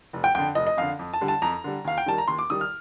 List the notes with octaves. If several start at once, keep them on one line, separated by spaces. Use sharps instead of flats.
F1
G5
F2 D3 G5
F1 D#5
D#5
F2 D3 F5
F2
A5
D3 G3
A5
F2 A#5
D3 G3
D#2 F5
G5
D#3 G3 A5
A#5
D#2 C6
D6
D#3 G3 D#6
F6